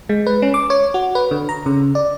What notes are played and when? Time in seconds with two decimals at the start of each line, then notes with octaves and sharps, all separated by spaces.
0.09 G#3
0.27 B4
0.42 C#4
0.54 D6
0.70 C#5
0.94 F#4
1.15 B4
1.31 D3
1.49 A#5
1.66 C#3
1.95 D5